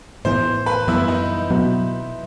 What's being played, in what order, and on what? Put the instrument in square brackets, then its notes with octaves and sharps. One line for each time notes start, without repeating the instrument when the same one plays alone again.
[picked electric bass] A2 E3 B3 [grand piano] C5
[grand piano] B4
[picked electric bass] F#2 E3 G3 B3 [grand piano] E4
[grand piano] D#4
[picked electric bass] B2 F#3 B3